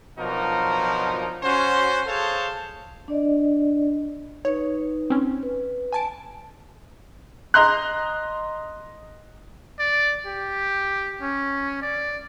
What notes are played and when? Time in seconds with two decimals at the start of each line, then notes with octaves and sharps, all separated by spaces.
0.18 B2 F3 F#3 D4 D#4 A#4
1.43 C#4 F#4 C5
2.06 G#4 A4 C5 C#5 F5 A5
3.08 D4 D5 D#5
4.45 D#4 B4 C#5
5.10 C4 C#4
5.43 B4
5.93 G#5 A5 D7
7.54 D#5 A#5 C6 F#6
9.80 D5
10.26 G4
11.21 C#4
11.82 D5